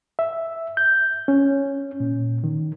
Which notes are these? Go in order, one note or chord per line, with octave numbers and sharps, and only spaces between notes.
E5
G6
C#4
A#2
D#3